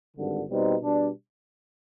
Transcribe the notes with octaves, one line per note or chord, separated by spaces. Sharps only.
G#1 G2 D3
B2 G3 C4 D#4
B2 G3 D4